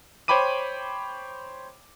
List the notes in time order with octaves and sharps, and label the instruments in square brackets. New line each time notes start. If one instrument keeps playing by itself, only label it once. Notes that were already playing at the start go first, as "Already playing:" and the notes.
[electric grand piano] C5 C#5 G5 B5 D6 D#7